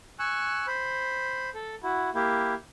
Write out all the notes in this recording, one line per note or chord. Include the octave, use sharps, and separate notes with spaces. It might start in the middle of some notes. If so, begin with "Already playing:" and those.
G#5 C#6 E6 F#6
C5 B5
A4
E4 F#4
A#3 E4 G4